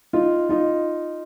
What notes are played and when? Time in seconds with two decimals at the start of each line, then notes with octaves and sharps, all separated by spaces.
0.13 D#4 F4
0.49 D#4 F4